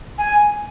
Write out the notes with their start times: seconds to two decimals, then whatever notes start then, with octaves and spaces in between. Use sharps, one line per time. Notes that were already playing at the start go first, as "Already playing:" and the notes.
0.18 G#5